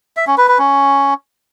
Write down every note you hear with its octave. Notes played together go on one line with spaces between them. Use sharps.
E5
C#4
B4
B4
C#4